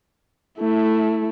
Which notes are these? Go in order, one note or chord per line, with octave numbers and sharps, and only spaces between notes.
A3 E4